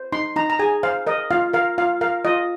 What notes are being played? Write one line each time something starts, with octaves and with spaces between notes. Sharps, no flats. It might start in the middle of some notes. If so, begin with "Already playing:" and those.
Already playing: C5
D#4 C6
D#4 A#5
A#5
G#4 G#5
C5 F5
A#4 D#5
F4 F5
A#4 F5
F4 F5
A#4 F5
F4 D#5